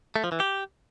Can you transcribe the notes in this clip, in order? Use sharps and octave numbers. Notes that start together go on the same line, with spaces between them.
A3
F3
E3
G4